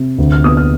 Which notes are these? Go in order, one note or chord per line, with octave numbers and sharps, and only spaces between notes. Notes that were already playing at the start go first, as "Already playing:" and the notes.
Already playing: C3
D2
F6
B3 D#6
F6